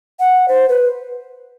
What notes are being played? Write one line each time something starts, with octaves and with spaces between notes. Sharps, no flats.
F#5
C5
B4